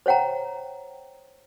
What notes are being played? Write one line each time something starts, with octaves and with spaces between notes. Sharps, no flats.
C5 C#5 F#5 G5 A#5